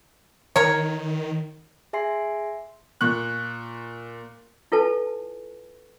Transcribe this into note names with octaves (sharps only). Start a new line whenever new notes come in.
D#3 A#4 C#5
G#4 E5 G#5 C6 C7
A#2 C#6 F#6
E4 F4 A4 B4 G#5 A5